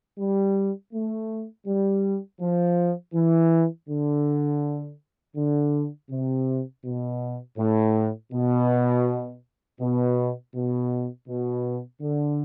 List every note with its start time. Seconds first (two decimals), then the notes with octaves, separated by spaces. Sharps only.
0.19 G3
0.93 A3
1.66 G3
2.40 F3
3.14 E3
3.89 D3
5.36 D3
6.10 C3
6.85 B2
7.58 A2
8.32 B2
9.80 B2
10.54 B2
11.28 B2
12.01 D3